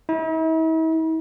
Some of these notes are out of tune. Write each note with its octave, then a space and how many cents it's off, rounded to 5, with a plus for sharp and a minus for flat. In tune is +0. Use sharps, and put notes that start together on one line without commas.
E4 -45